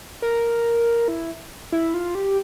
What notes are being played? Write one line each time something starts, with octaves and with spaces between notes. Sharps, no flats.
A#4
E4
E4
F4
G4